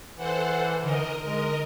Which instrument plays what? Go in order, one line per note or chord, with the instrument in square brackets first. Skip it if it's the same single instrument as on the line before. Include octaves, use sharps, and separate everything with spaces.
[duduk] E3 [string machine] A4 C5 F#5
[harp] D3 D#3 [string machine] A#4 D#5
[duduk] G#3 [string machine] A#4 D#5